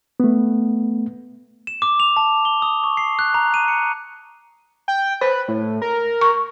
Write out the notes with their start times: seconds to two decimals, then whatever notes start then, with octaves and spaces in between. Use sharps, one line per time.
0.20 A3 B3
1.67 E7
1.82 D6
2.00 F7
2.17 A5
2.45 G7
2.62 D#6
2.84 C#6
2.97 C7
3.19 F#6
3.34 A#5
3.54 D#7
3.68 C#7
4.88 G5
5.21 B4 C5
5.48 A2
5.82 A#4
6.21 C#6